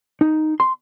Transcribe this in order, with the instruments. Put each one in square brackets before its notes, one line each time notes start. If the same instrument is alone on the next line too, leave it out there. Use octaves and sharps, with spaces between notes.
[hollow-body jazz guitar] D#4
C6